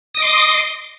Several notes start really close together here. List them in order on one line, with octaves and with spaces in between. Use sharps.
D#6 D#5 D6 C6